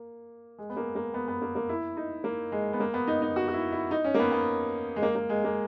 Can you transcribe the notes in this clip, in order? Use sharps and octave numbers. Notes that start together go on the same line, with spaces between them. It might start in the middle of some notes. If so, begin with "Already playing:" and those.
Already playing: A#3
G#3
B3
A#3
A#3
B3
B3
A#3
A#3
E4
D#4
A#3
G#3
B3
A#3
B3
D#4
D#4
F#4
F#4
E4
E4
D#4
C#4
A#3
B3
B3
G#3
A#3
A#3
G#3
A#3